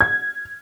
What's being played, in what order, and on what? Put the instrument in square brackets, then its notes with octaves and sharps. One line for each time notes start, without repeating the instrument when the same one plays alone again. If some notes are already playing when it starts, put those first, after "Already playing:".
[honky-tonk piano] G#6